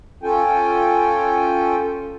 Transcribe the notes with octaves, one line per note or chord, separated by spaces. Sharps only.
C#4 F4 A4 G5 G#5